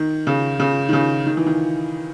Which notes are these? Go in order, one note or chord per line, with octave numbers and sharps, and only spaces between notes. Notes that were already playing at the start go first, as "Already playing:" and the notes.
Already playing: D#3
C#3
C#3
D#3
C#3
D#3
E3
D#3